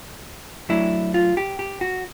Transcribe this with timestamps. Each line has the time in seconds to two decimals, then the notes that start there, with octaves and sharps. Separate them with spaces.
0.69 F#3 A3 D4 E4
1.14 F4
1.37 G4
1.59 G4
1.81 F#4